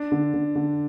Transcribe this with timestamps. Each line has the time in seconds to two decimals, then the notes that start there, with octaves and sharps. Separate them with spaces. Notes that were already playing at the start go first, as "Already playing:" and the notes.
Already playing: D4
0.12 D3
0.34 D3
0.55 D3